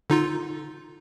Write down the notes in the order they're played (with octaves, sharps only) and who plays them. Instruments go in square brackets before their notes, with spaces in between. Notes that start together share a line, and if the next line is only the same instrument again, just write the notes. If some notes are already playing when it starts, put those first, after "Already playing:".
[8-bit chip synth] D3 D#4 F4